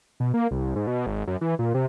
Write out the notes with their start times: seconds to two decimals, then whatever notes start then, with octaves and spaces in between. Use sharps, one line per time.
0.20 B2
0.34 A#3
0.51 C2
0.76 G#2
0.87 B2
1.06 G#1
1.27 F#2
1.41 E3
1.59 A#2
1.74 C3